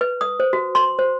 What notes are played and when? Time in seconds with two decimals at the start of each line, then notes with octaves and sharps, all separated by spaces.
0.01 B4
0.21 D#6
0.40 C5
0.53 F#4
0.75 C6
0.99 C5